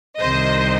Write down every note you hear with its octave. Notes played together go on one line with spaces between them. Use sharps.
C2 C3 D#3 C5 D#5